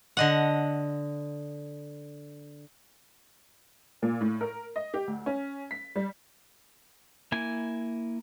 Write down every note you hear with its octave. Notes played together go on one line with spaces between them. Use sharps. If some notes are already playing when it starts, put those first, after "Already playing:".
D3 D#5 F#5
A#2
A2
A#4
D#5
G4
D2
C#4
B6
G3
A#3 E4 G#5